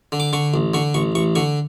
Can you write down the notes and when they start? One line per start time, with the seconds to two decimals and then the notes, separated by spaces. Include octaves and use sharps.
0.12 D3
0.20 D6
0.33 D3 C#6
0.54 A1
0.74 D3 C#6
0.94 A1 C#6
1.15 A1 C#6
1.35 D3 C#6